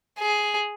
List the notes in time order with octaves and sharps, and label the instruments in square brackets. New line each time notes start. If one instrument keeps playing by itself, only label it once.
[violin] G#4